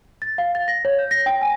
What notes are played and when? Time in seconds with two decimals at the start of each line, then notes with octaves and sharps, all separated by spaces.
0.22 A6
0.38 F5
0.55 A6
0.68 A#6
0.85 C#5
0.99 G6
1.11 A#6
1.26 G5
1.42 G#5